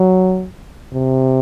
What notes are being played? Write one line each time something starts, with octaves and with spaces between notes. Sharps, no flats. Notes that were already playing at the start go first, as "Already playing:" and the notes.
Already playing: F#3
C3